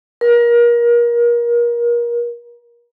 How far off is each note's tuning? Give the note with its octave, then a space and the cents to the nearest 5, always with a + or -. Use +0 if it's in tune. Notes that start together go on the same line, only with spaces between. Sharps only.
A#4 +30